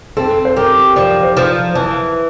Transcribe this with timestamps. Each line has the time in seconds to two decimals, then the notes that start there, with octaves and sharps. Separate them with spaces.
0.17 C4 A4
0.45 C5
0.56 G4 A#4
0.96 F3 D5
1.23 C5
1.37 F3
1.75 E3 A5